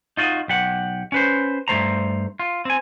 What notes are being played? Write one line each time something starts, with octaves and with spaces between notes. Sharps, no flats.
D#4 F4 F#4 D#5
B1 G4 F#5
C#4 B4 C5
G2 A3 C5 A#5
F4
C4 G#5